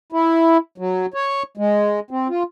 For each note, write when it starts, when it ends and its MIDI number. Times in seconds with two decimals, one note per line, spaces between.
0.12 0.57 64
0.78 1.06 54
1.14 1.43 73
1.57 2.00 56
2.11 2.28 60
2.29 2.43 65